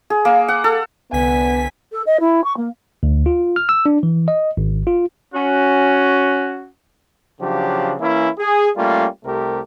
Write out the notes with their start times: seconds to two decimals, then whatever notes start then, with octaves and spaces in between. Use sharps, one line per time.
0.10 G#4
0.25 A#3
0.48 F#5
0.64 A4
1.13 C2 D3 B3 G#5 B6
1.92 A4
2.06 D#5
2.20 E4
2.44 C#6
2.57 A#3
3.03 D2
3.26 F4
3.56 F6
3.69 E6
3.86 D4
4.03 E3
4.28 D#5
4.57 G#1
4.87 F4
5.33 C#4 F#4
7.41 C#3 F3 F#3 D4 G4
8.00 E3 A#3 C#4 E4
8.39 G#4
8.77 G3 A3 A#3 C#4 F4
9.25 C2 C3 A3 G4 A#4